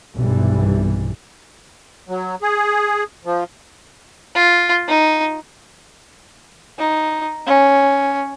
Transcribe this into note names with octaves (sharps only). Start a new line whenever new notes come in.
B1 G2 C3 E3 G3
F#3
G#4
F3
F4
D#4
D#4
C#4